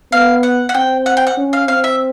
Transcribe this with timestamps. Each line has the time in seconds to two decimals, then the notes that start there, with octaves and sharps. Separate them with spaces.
0.12 B3 F5
0.43 F#5
0.69 F#5
0.75 C4 G5
1.06 F#5
1.17 G5
1.27 F#5
1.37 C#4
1.53 F5
1.68 C4 F5
1.84 E5